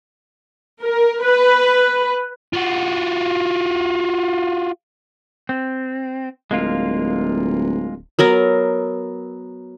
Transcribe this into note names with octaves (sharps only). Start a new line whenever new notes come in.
A#4
B4
F4 F#4
C4
D1 G#3 A#3 F4
F#3 B3 A#4